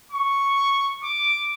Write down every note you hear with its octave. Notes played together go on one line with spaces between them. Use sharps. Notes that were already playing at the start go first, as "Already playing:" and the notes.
C#6
D6